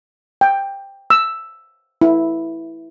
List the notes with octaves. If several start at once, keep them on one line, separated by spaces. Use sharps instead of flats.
G5
E6
E4